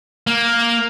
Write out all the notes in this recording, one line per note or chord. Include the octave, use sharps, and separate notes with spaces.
A#3